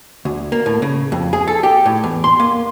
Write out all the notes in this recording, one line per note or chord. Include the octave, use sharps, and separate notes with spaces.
D2
A#3
A2
C#3
F2
G#4
A4
G4
A2
E2
C6
A#3